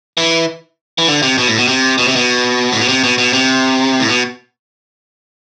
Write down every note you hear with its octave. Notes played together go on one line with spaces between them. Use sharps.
E3
E3
D3
C3
B2
A2
B2
C3
B2
C3
B2
A2
B2
C3
B2
B2
C3
A2
B2